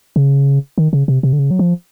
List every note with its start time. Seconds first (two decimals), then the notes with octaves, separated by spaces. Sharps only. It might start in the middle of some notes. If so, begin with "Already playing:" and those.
0.16 C#3
0.78 D#3
0.93 C#3
1.08 C3
1.23 C3
1.33 D3
1.39 C#3
1.51 F#3
1.59 F3